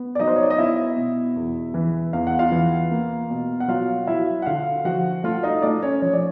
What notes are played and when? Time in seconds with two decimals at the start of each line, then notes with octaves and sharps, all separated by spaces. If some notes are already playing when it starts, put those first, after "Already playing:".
Already playing: B3
0.15 D5
0.19 F#3 D#4 D#5
0.27 C5
0.36 C#5
0.43 D5
0.50 D#5
0.58 B3 E4 E5
0.96 B2
1.36 E2
1.74 E3
2.13 E2 F5
2.27 F#5
2.39 F4 F5
2.52 E3
2.91 A#3
3.30 B2
3.60 F#5
3.68 F#3 F4 F5
4.07 F#3 E4 E5
4.42 F#5
4.46 D3 F4 F5
4.85 F3 F#4 F#5
5.24 A3 F4 F5
5.43 D#4 D#5
5.62 A3 D4 D5
5.83 C#4 C#5
6.02 F3 C#5
6.13 D5